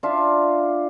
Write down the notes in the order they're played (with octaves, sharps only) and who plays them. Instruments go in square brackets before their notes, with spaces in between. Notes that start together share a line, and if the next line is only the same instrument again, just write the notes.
[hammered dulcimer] D4 F4 E5 F5